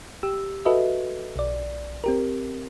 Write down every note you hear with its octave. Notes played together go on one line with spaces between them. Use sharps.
G4 E6
F#4 A4 B4 D#5 E5
B1 D5
C4 G4 A#4